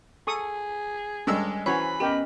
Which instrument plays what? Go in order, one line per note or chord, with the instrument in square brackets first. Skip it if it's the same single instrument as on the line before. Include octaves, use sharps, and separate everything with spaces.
[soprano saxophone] G#4 [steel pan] A4 C#6 D#6
[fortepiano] G2 G#3 E6 [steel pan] C#4 D4 A4
[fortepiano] E3 [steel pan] C#4 F#4 C#5 [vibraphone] C5 [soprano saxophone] B5
[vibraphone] B3 C#4 D#5 [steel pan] G4 A#4 G5